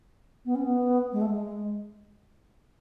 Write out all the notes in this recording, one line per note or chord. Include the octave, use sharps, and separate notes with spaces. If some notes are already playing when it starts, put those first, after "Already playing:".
B3
C#4
B3
G#3
A3
G#3